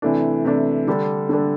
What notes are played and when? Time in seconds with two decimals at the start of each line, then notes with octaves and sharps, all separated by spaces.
0.02 C3 E3 A3 D4
0.45 C3 E3 A3 D4
0.87 D3 G3 D4 A4
1.29 D3 G3 D4 A4